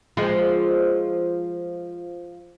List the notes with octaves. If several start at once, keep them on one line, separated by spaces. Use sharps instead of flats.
F3 G#3